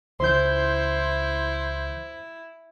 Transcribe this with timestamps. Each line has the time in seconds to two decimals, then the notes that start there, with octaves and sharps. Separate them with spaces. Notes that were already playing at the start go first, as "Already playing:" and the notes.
0.20 C#2 E3 E4 C5 C6 G6